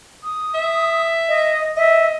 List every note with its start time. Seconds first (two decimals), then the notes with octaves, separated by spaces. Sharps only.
0.24 D#6
0.54 E5
1.29 D#5
1.77 D#5 E5